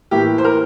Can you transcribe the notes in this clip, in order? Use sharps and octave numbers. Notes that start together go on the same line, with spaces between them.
A2 E3 A#3 E4 G4
C5
A#4